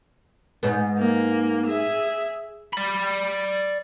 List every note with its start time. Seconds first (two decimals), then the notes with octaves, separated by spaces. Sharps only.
0.63 G#2 B3
0.99 A#3
1.67 G#4 E5
2.73 D5 B5